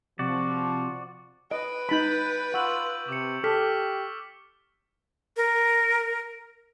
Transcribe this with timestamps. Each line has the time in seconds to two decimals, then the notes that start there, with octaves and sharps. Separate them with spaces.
0.19 C3 F3 F#4 D5
1.51 B4 D#5 D7
1.89 D#4 B5 G6 A6 B6
2.54 F4 F#5 C#6 E6 F#7
3.08 C3 D6 C#7
3.44 G4 A4 D6 F6 B6
5.37 A#4